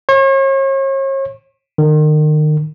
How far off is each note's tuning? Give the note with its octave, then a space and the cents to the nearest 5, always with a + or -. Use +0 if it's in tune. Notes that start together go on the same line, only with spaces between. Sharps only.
C#5 -40
D#3 -35